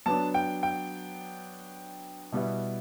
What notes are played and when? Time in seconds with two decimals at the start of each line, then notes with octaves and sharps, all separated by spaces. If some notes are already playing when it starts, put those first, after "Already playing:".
0.06 F#3 B3 D4 A5
0.34 G5
0.63 G5
2.32 B2 G3 B3 E4